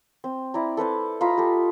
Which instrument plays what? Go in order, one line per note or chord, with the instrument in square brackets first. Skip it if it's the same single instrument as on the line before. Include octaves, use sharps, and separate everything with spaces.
[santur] C4
E4 D5 A#5
A4 B4 C5 A5
F4 D#5 A#5 B5
G4 A4